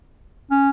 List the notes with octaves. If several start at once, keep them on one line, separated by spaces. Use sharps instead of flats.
C#4